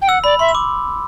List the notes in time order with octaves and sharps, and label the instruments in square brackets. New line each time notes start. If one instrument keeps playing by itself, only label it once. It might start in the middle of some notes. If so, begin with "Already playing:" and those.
[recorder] G5
[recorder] F#5 [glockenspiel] E6
[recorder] D5 [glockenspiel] B5
[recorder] E5 [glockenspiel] C6
[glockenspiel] E6
D6